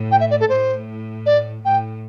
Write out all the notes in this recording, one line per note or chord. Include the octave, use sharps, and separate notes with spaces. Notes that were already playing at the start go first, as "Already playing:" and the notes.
Already playing: A2
G5
E5
D5
A4
A2 C5
D5
A2 G5